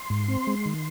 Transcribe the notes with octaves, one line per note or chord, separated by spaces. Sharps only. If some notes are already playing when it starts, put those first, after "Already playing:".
Already playing: C6
G#2
C4
G#3
D#3